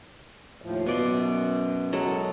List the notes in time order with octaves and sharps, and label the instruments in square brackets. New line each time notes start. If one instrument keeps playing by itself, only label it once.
[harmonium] D#2 A2 F3
[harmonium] F#2 [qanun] B2 D5 C6
[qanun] F#3 G#3 A4